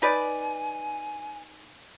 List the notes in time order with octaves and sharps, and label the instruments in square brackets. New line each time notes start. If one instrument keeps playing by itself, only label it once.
[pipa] D#4 B4 D5 [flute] G#5